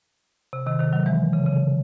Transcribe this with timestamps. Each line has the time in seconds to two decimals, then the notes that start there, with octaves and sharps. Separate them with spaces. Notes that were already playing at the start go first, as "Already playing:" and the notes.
0.53 C3
0.66 C3 D#3
0.79 C3 D#3
0.92 D#3 F#3
1.06 E3 G#3
1.33 C#3
1.46 C#3